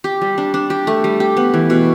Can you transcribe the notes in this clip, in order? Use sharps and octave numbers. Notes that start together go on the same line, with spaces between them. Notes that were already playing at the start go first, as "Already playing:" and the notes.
G4
G3
D4
D4
G4
A3
G3
G4
B3
E3
B2